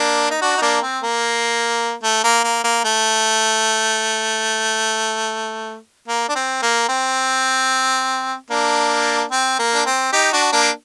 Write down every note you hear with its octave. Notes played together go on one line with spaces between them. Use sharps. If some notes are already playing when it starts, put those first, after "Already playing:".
Already playing: A#3 D4
D#4
D4 F#4
D#4
A#3 D4
C4
A#3
A3
A#3
A#3
A#3
A3
A#3
D4
C4
A#3
C4
A#3 D4
C4
A#3
D4
C4
D#4 G4
D4 F#4
A#3 D4